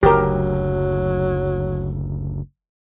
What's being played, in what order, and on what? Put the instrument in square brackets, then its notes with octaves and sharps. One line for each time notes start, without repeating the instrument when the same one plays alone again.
[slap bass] F#1 D2 [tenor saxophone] F#3 [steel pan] G4 A#4